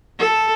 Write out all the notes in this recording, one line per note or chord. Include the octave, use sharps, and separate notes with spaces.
A4